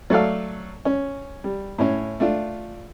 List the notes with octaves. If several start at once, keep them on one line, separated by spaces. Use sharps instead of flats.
F#3 A3 A4 D5 F5
C#4
G3
A2 C#4
A3 D4 F4